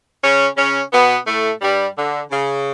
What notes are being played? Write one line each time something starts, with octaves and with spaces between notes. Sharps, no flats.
C#3 C#4
C#3 C#4
B2 B3
A2 A3
G2 G3
D3
C#3